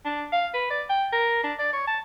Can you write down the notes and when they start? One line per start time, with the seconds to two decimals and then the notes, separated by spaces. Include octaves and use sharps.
0.05 D4
0.33 F5
0.54 B4
0.70 D5
0.90 G5
1.13 A#4
1.44 D4
1.59 D5
1.73 C#5
1.87 A5